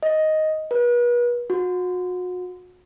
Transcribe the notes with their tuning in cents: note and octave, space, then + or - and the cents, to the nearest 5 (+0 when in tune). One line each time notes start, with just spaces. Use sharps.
D#5 +5
B4 -40
F#4 -35